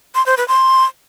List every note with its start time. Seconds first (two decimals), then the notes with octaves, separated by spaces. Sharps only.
0.15 C6
0.26 C5
0.37 B4
0.48 C6